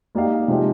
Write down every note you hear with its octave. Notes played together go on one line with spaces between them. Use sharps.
A#3 D#4 G4 D5 F5
C3 F3 G#3 D#4 G4